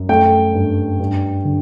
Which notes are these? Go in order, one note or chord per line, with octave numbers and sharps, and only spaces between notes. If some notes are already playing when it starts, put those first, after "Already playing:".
Already playing: F#2
A3 G5
G2
G2
D3